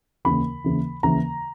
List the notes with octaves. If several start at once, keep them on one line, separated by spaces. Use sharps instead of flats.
D#2 C#3 E3 B5
D#2 C#3 E3
D#2 C#3 E3 A#5